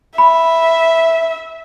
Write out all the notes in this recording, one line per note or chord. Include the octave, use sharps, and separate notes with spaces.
E5 B5